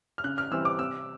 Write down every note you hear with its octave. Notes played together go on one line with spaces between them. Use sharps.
F6
C#3 F#6
F6
E3 G3 C4 E6
D6
C3 E6